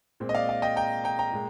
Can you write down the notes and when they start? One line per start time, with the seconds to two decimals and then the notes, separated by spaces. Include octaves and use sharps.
0.20 A#2 G#3 C4
0.29 D#5
0.35 D5 F5
0.49 D5 F5
0.62 D#5 G5
0.76 G5 A#5
1.04 G5 A#5
1.19 G5 A#5
1.33 A#2 G#3